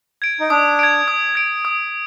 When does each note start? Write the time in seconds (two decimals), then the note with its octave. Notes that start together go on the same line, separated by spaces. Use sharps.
0.22 G#6 D7
0.40 D#4
0.50 D4 D#6
0.79 G#6 D7
1.08 D#6
1.35 G#6 D7
1.65 D#6